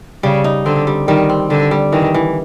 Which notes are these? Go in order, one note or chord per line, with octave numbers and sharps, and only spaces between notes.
C#3 G3
D#4
D3 C4
G3
D#3 G3
C4
D3 G3
G3
D#3 E3
E3